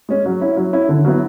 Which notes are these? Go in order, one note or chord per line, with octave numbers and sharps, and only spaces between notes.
G#3 C#4
F#3
C#4 E4
F#3
C#4 E4
D3
F#3 B3 E4